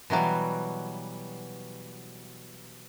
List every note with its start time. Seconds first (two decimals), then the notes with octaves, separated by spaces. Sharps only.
0.10 B2 E3 F#3 G3